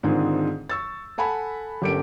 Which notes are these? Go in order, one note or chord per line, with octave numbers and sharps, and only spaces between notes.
G#2 D3 D#3 C4 F4 G#4
C#6 E6 A6
A4 F#5 G#5 A5 B5
G1 C#4 G4 A4 A#4 D7